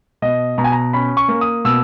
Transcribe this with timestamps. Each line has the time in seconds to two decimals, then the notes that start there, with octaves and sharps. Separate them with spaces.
0.22 B2 D#5
0.58 B2 A#5
0.64 G#5
0.72 A#5
0.93 C#4 B5
1.17 C#6
1.29 A#3
1.41 D#6
1.65 B2 E6